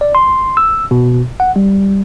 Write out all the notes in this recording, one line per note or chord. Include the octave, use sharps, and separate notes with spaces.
D5
C6
E6
B2
F#5
G3